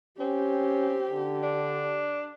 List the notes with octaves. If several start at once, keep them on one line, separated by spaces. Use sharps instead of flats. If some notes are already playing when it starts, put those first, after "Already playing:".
C4 C#4 G4
D3
D4